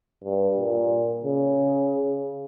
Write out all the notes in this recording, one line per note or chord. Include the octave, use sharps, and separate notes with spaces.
G2
A#2
C#3